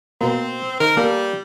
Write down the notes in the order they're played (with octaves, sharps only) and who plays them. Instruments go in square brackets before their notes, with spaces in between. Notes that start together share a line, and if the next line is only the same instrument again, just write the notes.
[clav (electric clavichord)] B2 A#3 [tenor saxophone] C4
[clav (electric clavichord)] D#3 [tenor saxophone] A#4
[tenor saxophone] G3 [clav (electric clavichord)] A#3 A4 A#4